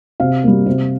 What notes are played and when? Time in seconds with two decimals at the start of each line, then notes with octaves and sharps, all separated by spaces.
0.20 C3 F5
0.44 G3 A#3
0.66 C3